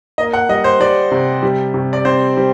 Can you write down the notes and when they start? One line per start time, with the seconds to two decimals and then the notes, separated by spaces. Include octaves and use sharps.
0.18 A#3 D#5
0.33 F#5
0.49 G3 D#5
0.64 C5
0.80 G3 D5
1.12 C3
1.43 G3
1.74 C3
1.93 D5
2.05 C4 C5
2.37 G3